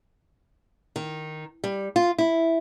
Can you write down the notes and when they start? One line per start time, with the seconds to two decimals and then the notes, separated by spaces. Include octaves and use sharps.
0.96 D#3
1.64 G3
1.96 F4
2.18 E4